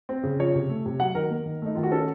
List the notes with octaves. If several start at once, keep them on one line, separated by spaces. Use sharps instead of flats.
C4
C#3
F3 C#5
C3
A3
C3
F#3 F#5
D#3 A#4
A#3
D#3
A3 D#4
D#3 F4
F#4
C#4 A4